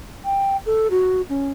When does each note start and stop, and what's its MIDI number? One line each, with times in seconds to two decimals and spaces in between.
0.24 0.57 79
0.66 0.88 69
0.90 1.22 66
1.29 1.51 61